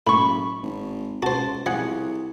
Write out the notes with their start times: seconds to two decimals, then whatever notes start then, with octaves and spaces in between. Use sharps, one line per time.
0.07 F#1 A2 B5 C#6
0.62 G#1
1.22 C#2 F#4 C5 A5
1.66 C2 F3 G#4 F#5